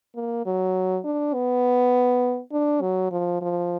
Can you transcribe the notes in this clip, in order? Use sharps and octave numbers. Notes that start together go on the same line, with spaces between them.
A#3
F#3
D4
B3
D4
F#3
F3
F3